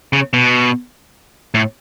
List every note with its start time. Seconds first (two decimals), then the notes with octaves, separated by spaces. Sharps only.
0.13 C#3
0.33 B2
1.55 A2